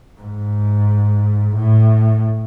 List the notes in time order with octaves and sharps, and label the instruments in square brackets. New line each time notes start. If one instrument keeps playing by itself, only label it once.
[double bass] G#2
A2